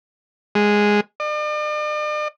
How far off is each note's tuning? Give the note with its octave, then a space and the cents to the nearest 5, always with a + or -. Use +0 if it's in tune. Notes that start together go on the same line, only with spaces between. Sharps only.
G#3 -5
D5 +45